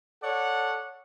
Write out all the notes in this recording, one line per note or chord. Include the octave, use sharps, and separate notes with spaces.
A4 C#5 D5 F#5